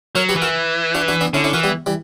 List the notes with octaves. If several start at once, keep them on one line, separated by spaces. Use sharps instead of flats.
F#3 A#4 C#5
G4 B4
E3
F#4 A#4
D4 F#4
D4 F#4
B3 D4
D3 C#4 E4
C#4 E4
E3 F#4 A#4
G3 B3
E3 G3